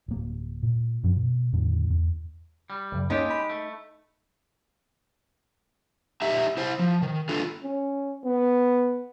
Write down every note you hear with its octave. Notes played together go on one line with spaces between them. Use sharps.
D1 A#3
A#2
F#2 F3 C#4
B2
E2 A2 D3 D#3
E2
G3
C#2 F#2
G#3 A#3 C#4 D#4 G4
B5
A3
D#4 G4 E5 A#5
E4 C5
F3
D#3
D4 F4 A4
C#4
B3